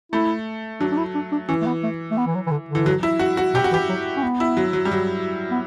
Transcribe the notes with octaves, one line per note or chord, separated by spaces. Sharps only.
A3 E4
F#3 D4
D4
E4
D4
D4
E3 C#4
A3
B3
A3
A3
B3
E3
F#3
E3
D3
D3
E3
F#3
E4
F#4
F#4
B2 G4
F#4
E3 G4
F#3
C#4
B3
E4
F#3
F#3
G3
F#3
B3